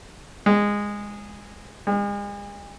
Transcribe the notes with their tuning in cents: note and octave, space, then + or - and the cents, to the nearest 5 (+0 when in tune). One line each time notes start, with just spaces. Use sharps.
G#3 -15
G#3 -40